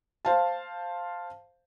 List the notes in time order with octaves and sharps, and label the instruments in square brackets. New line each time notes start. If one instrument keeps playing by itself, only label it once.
[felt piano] C5 F5 A5